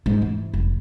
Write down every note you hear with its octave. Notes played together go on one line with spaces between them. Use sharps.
G#2
E3
F1